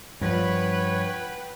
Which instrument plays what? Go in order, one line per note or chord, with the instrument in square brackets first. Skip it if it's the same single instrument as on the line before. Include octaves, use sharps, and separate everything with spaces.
[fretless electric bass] G2 F3 [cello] B4 [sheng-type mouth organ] C#5 [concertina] F#5 G5 B5